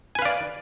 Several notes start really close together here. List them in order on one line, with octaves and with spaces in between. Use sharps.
G#5 B4 F5 D5